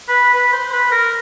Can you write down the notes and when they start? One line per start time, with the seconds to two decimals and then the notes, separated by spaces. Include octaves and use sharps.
0.08 B4
0.34 B4
0.53 C5
0.73 B4
0.91 A#4